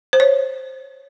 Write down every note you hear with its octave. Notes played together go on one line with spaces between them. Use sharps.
C5
C#5